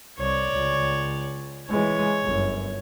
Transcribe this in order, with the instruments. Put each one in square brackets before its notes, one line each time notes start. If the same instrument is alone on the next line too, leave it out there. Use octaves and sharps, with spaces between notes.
[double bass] C2 [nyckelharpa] C#5 D5
[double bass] C#2
[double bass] E3 G#3 [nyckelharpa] C#5
[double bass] G1 F#2